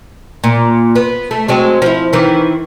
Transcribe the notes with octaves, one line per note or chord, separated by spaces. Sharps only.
A#2
B3
A3
F#3 G#3 C4
F3 E4
D#3 E3